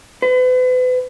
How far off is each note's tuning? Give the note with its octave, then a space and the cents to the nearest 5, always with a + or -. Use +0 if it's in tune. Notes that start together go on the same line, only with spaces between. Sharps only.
B4 +40